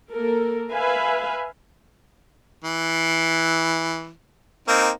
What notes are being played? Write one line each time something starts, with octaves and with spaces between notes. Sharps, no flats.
A#3 A4 A#4
B4 E5 F5 G#5
E3
A#3 C4 D#4